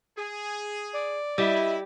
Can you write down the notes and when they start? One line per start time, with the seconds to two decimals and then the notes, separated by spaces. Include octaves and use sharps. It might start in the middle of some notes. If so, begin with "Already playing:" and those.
0.18 G#4
0.93 D5
1.38 G3 E4 G4 D#5 E5